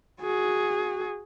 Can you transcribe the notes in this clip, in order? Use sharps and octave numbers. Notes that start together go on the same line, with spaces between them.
F#4 G#4